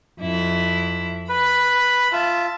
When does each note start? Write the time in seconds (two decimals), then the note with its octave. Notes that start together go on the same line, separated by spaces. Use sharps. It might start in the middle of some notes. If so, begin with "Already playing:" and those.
0.21 F2 E4
1.29 B4 B5
2.12 F4 E5 A5